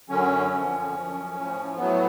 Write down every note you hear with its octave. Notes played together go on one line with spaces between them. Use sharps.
F#2 D3 F#3 C#4
F2 D3 F3
F#2 F3
A2 F3
A2 F#3 B3